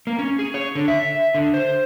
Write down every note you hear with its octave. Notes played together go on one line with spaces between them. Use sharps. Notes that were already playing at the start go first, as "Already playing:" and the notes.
A#3
C#4
G#4
C#5
D3
E5
D3
C5